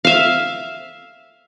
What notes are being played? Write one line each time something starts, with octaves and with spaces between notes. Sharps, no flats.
E5 F5